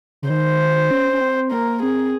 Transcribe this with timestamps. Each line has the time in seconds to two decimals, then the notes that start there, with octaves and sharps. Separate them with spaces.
0.22 C#3
0.30 D#3 C5
0.91 C#4
1.13 C#4
1.21 C4
1.52 A#3 A#4
1.83 C4 G#4